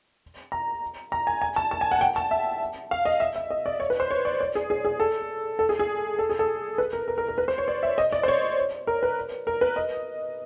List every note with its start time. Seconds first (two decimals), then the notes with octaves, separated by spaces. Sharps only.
0.52 A#5
1.12 A#5
1.27 G#5
1.41 G#5
1.56 A5
1.71 A5
1.81 G#5
1.91 F#5
2.01 G5
2.16 A5
2.31 E5
2.91 F5
3.05 D#5
3.20 E5
3.36 E5
3.50 D#5
3.66 D5
3.80 C#5
3.90 B4
4.00 C5
4.10 C#5
4.25 D5
4.40 D5
4.55 G#4
4.70 G#4
4.85 G#4
5.00 A4
5.59 A4
5.69 G#4
5.79 G#4
6.19 A4
6.29 G#4
6.39 A4
6.78 B4
6.93 A#4
7.08 A#4
7.18 A#4
7.28 A#4
7.38 B4
7.48 C5
7.58 C#5
7.68 D5
7.83 E5
7.98 D#5
8.12 D5
8.23 C5
8.28 C#5
8.87 A#4
9.03 B4
9.47 A#4
9.61 B4
9.76 D#5